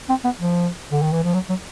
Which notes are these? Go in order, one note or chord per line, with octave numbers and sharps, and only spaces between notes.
C4
B3
F3
D3
D#3
E3
F3
F#3
F#3